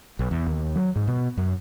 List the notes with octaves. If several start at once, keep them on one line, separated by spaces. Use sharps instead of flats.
B1
E2
D#2
F#3
G#2
B2
F#2